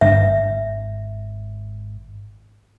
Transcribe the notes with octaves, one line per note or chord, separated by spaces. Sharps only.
G#1 E5